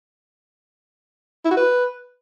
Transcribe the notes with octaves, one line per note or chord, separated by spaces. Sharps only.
E4
F#4
B4